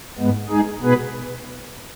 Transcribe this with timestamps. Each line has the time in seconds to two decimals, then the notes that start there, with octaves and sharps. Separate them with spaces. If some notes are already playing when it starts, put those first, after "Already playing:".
0.18 G#2 G#3 B3
0.49 G#3 D#4 G#4
0.82 B2 B3 G#4 B4